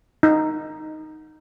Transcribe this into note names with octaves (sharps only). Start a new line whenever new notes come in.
D#4